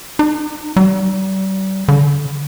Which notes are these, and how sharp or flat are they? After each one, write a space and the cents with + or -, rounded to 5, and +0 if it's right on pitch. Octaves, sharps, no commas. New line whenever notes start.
D#4 -35
G3 -40
D3 -25